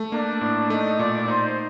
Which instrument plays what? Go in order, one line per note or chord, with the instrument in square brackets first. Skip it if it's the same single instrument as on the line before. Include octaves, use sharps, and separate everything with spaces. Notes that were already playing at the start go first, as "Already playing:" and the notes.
Already playing: [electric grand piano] A3
[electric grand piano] A#3 [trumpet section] D4
[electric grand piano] A2
[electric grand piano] A3 [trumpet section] D#4
[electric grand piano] A#2 [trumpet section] D5
[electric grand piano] D#4 [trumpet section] C5